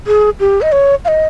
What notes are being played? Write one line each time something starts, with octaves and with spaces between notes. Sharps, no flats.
G#4
G4
D#5
C#5
F5
D#5